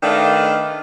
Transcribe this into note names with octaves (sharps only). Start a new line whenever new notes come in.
D#3 A3 D4 B4 D#5 F5